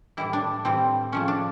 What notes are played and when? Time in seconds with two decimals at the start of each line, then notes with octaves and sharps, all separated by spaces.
0.17 A2 E3 G3 E4
0.33 D4
0.65 A2 E3 G3 C4
1.12 C#3 F3 A3 C#4
1.28 D4